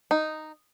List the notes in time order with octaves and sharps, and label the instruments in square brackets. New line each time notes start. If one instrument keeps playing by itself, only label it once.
[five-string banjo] D#4